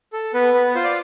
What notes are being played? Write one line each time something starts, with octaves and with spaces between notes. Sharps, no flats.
A4
B3 B4
B3
F4 C5
D5